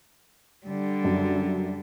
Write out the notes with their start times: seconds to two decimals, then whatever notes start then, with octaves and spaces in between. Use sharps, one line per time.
0.66 D3 G3
1.04 F#2